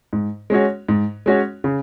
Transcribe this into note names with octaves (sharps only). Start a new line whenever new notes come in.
G#2
G#3 C#4 F#4 C#5
G#2
G#3 C#4 F#4 C#5
C#3